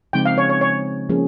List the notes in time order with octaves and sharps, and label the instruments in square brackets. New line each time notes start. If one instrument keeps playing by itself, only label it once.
[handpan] C#3 F3 G#3 C4 D#4 [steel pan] G5
[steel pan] F5
C#5
C#5
C#5
[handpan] F3 A#3 C#4 G#4